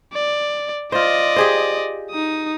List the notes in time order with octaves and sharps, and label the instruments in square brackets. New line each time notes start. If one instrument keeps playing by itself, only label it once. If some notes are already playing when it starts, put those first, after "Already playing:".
[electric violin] D5
[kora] F4 C5 [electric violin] D5 D#5
[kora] G4 G#4 C5
[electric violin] D#4 D#6